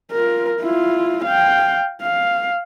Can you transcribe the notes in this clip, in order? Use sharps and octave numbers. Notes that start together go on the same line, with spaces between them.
F4 A#4
E4 F4
F5 G5
F5